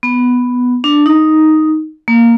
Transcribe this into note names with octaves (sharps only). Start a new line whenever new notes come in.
B3
D4
D#4
A#3